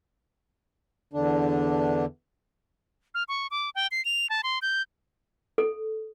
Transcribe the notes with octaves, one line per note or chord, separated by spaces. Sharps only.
E2 D3 D4
F6
C#6
D6
G5
C7
F7
A5
C6
G6
A4